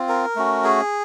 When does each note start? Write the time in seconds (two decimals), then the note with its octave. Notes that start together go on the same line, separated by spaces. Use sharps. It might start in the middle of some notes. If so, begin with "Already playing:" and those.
Already playing: C4 F4
0.09 A#4
0.36 A3 C#4 F#4
0.64 G#4